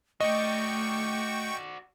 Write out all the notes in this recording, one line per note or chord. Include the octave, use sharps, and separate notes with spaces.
A3 F#4 D5 D#5 G5 C#6